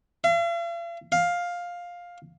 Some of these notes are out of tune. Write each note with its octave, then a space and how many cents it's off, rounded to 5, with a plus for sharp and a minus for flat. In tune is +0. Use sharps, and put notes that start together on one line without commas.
F5 -45
F5 +10